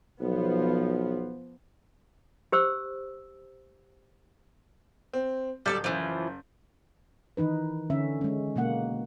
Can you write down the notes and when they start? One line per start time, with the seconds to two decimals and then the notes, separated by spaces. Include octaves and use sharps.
0.21 B1 F3 B3
2.52 G4 C5 E6
5.13 C4
5.66 D1 G3 A4 D5 G6 A6
5.84 F#1 E3 F3
7.37 D#3 E3 D#4 B4
7.90 D3 C#4 E5
8.21 G#3 C#4
8.56 B2 G#3 A#3 F#5